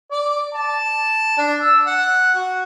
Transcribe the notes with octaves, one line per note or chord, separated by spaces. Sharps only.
D5
A5
D4
E6
F#5
F#4